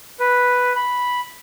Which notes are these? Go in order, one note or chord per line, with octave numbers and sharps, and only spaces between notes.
B4
B5